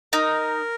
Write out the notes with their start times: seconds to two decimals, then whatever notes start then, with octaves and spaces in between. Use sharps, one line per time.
0.13 D#4 A#4